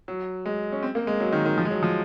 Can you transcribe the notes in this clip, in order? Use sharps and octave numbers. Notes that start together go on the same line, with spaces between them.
F#3
G#3
C#4
C4
A#3
G#3
F#3
D#3
D#3
F3
G#3
F#3
F3